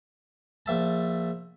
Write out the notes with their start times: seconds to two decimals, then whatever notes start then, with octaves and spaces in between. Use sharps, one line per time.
0.66 A#1 E5 A5